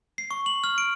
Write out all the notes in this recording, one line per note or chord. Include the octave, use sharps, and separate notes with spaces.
C7
C#6
F#7
F6
D7